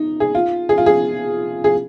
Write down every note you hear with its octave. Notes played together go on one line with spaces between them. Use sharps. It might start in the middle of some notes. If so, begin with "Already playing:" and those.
Already playing: D#4
G#4
F4
G#4
F4
G#4
G#4